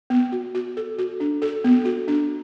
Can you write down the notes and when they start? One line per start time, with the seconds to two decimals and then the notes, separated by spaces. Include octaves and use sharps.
0.10 B3
0.32 F#4
0.55 F#4
0.77 A4
0.98 F#4
1.20 D4
1.42 A4
1.64 B3
1.85 F#4
2.08 D4